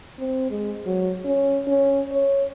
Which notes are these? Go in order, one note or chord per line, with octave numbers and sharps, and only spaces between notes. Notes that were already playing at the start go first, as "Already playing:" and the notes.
C4
G#3
F#3
C#4
C#4
C#5